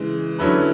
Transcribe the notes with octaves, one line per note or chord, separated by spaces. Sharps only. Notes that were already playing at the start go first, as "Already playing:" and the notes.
Already playing: C#3 E3 G#3
D3 F#3 C#4 E4 B4